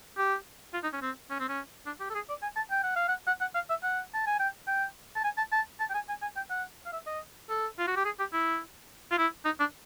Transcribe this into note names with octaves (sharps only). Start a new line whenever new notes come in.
G4
F4
D#4
C#4
C4
C#4
C4
C#4
D4
G4
A4
G#4
D5
G#5
A5
G5
F#5
F5
F#5
F#5
F#5
F5
E5
F#5
A5
G#5
G5
G5
A5
G#5
A5
A5
A5
G5
G#5
G#5
G#5
G5
F#5
F5
E5
D#5
A4
F4
F#4
G4
G#4
G4
E4
F4
E4
D#4
D4